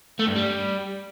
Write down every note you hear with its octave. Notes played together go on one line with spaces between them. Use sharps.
A3
G2
G3